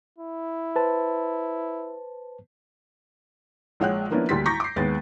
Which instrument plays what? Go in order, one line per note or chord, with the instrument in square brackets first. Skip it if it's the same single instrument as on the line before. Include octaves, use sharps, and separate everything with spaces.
[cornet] E4
[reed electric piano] B4 C5 A5
[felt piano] A#1 G#3 C#5 F#5 G5 F#6
F3 A#3 B3 C#4 D4 E4
D2 G3 A#3 C6 A6 B6
A#5 C#6 D6 G6 A#6 B6
D6 C7
D#2 G#3 B3 B4 A6